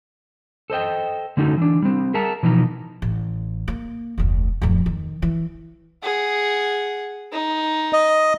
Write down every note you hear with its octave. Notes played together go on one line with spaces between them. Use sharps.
A4 C5 D#5 G5
D3 A3 C#4 D#4 F#4 A4
E3 D4
G3 C4
G#4 A#4 E5 F#5 A5 A#5
B2 E3 F3 D#4 A4 A#5
A1
A#3
F1 D2
D1 F2
D#3
E3
G#4 F#5
D#4
D#5